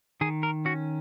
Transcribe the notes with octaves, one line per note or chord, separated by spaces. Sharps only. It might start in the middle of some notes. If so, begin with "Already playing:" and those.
D#3 G#4
A#4
C#4 F#4